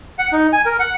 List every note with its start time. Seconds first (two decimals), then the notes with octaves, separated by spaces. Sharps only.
0.19 F#5
0.32 D#4
0.53 G#5
0.66 A#4
0.79 F#5